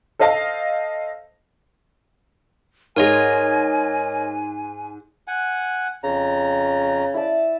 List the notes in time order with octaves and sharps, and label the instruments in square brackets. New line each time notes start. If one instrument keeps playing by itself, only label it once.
[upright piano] A4 C5 D#5 F5 A5
[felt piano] G#2 G#3 [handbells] A#4 C#5 D#5 [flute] G#5
[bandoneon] F#5 G#5
[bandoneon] F2 A#5 [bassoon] C#3
[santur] E4 D5 A5